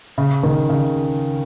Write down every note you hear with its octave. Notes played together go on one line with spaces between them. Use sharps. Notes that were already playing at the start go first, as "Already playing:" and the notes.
C#3
D#3
C#3